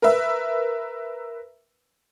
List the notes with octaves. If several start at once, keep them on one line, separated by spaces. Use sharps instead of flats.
A#4 B4 E5